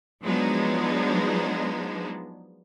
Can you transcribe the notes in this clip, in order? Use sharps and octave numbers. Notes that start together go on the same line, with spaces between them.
F3 F#3 G#3 B3 D4 D#4